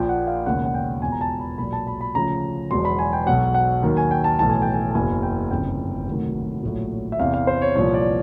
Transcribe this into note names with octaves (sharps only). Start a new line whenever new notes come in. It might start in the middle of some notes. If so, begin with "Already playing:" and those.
Already playing: A#1 A#2 F3 G5
F#5
F5
E1 D#2 C#3 F#5
F#5
G5
E1 E2 B2 G#5
A#5
A5
B5
B1 A#2 F#3 B5
A5
B5
B5
D2 C#3 F3 A#5
E1 E2 B2 F#3 C6
B5
G#5
G5
B1 B2 F#3 F#5
F#5
D#2 D#3 F#3
G#5
G5
A5
B1 A2 E3 A5
G#5
G5
G#5
A5
F#1 E2 B2 G#5
G5
G1 F2 C#3 F#3 G5
D2 C3 D#3 F#3
A#1 A2 F#3
E5
E2 C3 E3 F5
F5
C5
C#5
C2 A#2 F3 C#5
D5